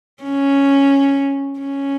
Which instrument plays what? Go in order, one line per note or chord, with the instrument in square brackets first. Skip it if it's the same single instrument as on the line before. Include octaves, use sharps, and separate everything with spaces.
[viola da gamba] C#4
C#4